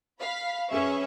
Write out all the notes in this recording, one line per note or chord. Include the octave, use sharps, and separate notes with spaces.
F5 B5 B6
F#2 C#4 G#4 B4 E5 C#6